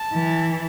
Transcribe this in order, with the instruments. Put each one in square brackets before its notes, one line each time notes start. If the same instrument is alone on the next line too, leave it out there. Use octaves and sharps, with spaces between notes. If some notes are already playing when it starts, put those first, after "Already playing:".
Already playing: [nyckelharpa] A5
[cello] E3